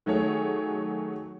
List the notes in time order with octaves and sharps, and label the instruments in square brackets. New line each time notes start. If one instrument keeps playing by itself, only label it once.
[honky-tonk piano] D#3 F#3 A3 G#4 C#5